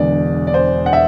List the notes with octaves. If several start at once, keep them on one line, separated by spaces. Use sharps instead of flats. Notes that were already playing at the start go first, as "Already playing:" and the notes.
Already playing: E1 E2 D3 D5
D5
C5
F#5
E5